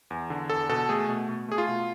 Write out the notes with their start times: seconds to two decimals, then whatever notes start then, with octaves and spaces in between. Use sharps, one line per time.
0.10 E2
0.30 D3
0.50 E2 A4
0.69 B2 A4
0.89 A3 G#4
1.09 B2
1.29 B2
1.48 A3 G#4
1.58 F4
1.68 B2